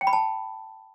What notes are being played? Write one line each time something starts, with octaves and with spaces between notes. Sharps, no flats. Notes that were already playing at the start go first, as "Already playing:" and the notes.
G5
B5
A5